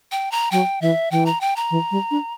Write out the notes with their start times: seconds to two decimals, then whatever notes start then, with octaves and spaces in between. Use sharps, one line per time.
0.12 G5
0.31 A#5
0.51 F#3 G5
0.81 E3 E5
1.11 E3 G5
1.26 A#5
1.41 G5
1.56 A#5
1.71 E3
1.91 G3
2.11 D4